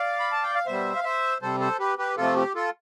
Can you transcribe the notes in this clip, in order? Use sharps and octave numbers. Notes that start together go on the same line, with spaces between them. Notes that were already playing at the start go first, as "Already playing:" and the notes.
Already playing: D5 F5
B5
A5
G5
F5
B2 G3 C5 E5
F5
C5 E5
C3 G3 A4 C5
A4 C5
G4 B4
G4 B4
C3 F3 A3 F4 A4
G4
F4 A4